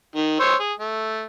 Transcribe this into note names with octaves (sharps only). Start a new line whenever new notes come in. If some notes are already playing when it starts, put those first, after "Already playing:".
D#3
C5 C#5 E6
G#4
A3